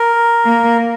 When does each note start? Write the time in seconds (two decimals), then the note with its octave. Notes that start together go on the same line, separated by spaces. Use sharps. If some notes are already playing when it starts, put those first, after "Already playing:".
Already playing: A#4
0.45 A#3